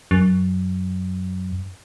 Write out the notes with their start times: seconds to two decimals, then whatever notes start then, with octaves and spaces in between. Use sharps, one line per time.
0.11 F#2